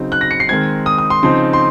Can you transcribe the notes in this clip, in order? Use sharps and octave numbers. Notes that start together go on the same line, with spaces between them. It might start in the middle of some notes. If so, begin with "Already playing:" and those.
Already playing: C#3 F#3 C4 D#4
F#6
A#6
C#7
C7
D#3 G#3 C4 G#6
D#6
D#6
C6
C#3 F3 C4 D#4 C6
C6